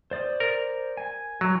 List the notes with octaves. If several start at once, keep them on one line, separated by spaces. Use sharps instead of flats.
C5 D5 D#6
A#4
G#5
F#3